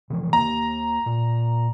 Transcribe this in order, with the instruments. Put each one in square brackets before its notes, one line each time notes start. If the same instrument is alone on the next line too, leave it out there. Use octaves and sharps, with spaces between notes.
[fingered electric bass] C3 E3 F3
[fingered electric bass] D#2 A#3 [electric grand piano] A#5
[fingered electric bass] A#2